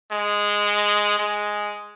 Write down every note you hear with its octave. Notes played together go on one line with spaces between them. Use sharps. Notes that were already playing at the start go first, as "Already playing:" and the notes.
G#3
G#3